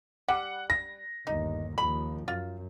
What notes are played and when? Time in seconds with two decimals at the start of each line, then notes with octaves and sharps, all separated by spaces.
0.28 G3 F#5
0.70 A#6
1.27 G1 D#2 D#4
1.78 D#2 F3 B5
2.28 F#2 F4